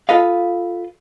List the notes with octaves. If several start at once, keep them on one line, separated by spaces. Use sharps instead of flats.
F4 A4 B4 D#5 F5